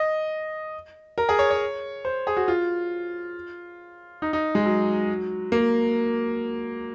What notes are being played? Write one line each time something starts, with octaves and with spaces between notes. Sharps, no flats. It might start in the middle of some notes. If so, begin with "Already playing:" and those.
Already playing: D#5
A#4
G#4
C#5
C#5
C5
G#4
F#4
F4
D#4
D#4
G#3
F#3
A#3